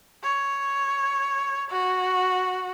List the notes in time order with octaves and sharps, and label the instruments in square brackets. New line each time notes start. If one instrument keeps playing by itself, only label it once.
[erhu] C#5
F#4